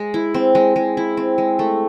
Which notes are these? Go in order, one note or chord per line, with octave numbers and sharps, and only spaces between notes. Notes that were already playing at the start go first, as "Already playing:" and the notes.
Already playing: G#3
E4
C4
G#3
G#3
E4
C4
G#3
A3